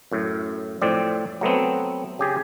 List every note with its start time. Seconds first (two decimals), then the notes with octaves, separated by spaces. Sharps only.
0.11 F#2 A2
0.81 F2 A2 C4 D5
1.41 F#3 A3 B3 C4
2.19 C#3 G4 G#4